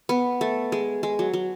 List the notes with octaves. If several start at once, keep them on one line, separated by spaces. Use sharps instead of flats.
B3
A3
G#3
G#3
F#3
F#3